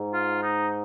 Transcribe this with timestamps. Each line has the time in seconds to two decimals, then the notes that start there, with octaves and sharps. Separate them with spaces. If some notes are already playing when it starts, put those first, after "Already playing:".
Already playing: G#2
0.14 F4
0.43 D#4